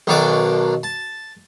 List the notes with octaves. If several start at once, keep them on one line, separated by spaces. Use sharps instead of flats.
B1 B2 D#3 D4 C#6 D6
A5